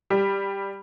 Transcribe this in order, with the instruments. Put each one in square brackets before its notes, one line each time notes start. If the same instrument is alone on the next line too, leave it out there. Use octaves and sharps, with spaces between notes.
[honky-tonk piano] G3